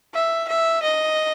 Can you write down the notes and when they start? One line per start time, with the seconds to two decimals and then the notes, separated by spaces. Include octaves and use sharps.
0.14 E5
0.48 E5
0.83 D#5